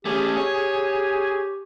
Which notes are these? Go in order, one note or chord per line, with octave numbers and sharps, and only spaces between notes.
A3 C#4 G4 G#4
C#5